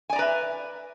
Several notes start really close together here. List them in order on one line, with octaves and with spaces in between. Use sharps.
G#5 D5 A#5 B4 E5